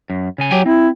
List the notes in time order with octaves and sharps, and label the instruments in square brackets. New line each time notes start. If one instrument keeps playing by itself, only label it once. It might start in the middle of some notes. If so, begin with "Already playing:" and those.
[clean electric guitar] F#2
C#3 G#5
[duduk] F#3 [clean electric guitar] G4 G5 G#5
[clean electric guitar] C4 [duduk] E4